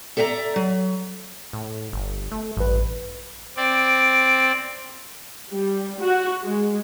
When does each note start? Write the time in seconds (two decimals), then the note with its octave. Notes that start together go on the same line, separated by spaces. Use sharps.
0.17 A4 D5 E5 G5 A#5
0.56 F#3
1.53 A2
1.93 G1
2.32 A3
2.57 A1 G2 B4
3.57 C4 D5
5.52 G3
6.01 F#4
6.43 G#3